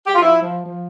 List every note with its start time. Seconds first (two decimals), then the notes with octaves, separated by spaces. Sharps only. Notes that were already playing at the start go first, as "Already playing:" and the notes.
0.07 G4
0.14 F4
0.22 F3 E4
0.41 F3
0.62 F3